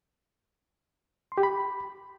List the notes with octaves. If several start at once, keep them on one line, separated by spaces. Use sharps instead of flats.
C6
G4
B5